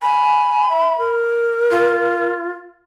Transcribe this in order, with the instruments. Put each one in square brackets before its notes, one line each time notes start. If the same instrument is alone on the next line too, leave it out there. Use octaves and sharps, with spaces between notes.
[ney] G#5 [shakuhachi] B5
[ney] E5
A#4
[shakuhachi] F4